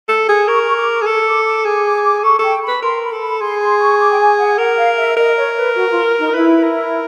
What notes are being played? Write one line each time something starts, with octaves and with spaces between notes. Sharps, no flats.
A4
G#4
A#4 C#6
C#6
D6
D6
G#4
A4
D6
D6
G#4 D6
D6
D6
A4 C#6
A4 G5
B5
B4
A#4 C6
B5
A4
B5
G#4 C6
C6
C#6
D6
G5
G#5
F#5
A#4 F#5
F5
E5
A#4 D#5
C#5
B4
F#4
F4
D#4
E4 B4
A#4